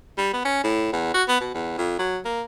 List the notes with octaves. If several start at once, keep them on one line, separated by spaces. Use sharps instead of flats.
G3
B3
C#4
A2
E2
F#4
B3
B2
E2
F2
F#3
A#3